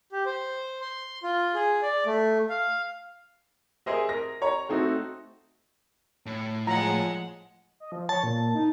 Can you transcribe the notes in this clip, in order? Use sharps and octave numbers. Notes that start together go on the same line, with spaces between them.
G4
C5
C6
F4
G#4
D5
A3
F5
G#4 A#4 C5 D#5 E5
A#4 A#6
C#5 A#5
A3 C4 D#4 F#4
A2
F3 G#3 F#5 A#5
D#5
F3
C#5 A5
A#2
D#4